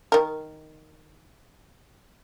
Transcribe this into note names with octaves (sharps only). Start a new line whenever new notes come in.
D#3 A#4